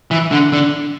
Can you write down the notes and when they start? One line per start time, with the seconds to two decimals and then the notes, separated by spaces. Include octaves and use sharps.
0.11 E3
0.31 D3
0.52 D3